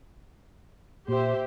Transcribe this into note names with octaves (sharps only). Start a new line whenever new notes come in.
A#2 G4 C5 E5